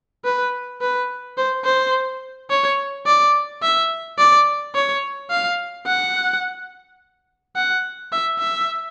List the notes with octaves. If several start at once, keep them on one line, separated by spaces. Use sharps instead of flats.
B4
B4
C5
C5
C#5
D5
E5
D5
C#5
F5
F#5
F#5
E5
E5